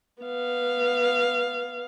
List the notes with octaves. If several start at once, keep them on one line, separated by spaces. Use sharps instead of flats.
B3 F5